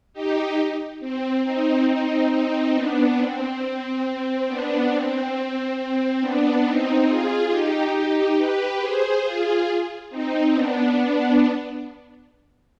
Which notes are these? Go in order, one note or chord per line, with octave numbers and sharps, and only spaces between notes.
D#4 G4
C4
C4 D#4
C4 D#4
C4 D#4
B3 D4
C4
B3 D4
C4
C4
B3 D4
C4 D#4
F4 G#4
D#4 G4
D#4 G4
G4 B4
G#4 C5
F4 G#4
C4 D#4
B3 D4